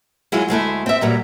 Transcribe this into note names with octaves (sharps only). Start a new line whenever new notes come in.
F#3 G#3 E4 F4
D2 G#3 A3 E4
C4 E5
A#2 F#3 G3